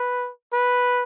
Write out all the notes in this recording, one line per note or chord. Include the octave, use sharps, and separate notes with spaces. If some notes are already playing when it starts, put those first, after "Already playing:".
Already playing: B4
B4